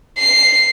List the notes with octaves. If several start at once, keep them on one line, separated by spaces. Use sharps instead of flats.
C7